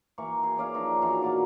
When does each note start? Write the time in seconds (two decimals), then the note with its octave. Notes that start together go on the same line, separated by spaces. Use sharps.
0.18 E3 A#3 C#6
0.44 G#4
0.57 C#4 D5 F5
0.74 F3 D#4
1.02 E3 D4 F#4 F5
1.22 B2 A#3 D5